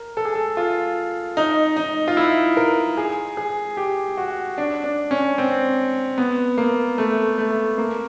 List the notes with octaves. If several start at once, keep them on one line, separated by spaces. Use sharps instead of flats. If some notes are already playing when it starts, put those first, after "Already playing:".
Already playing: A#4
A4
G#4
A4
F4
D#4
D#4
F4
E4
A#4
G#4
G#4
G4
F#4
D4
D4
C#4
C4
B3
A#3
A3
A3
A#3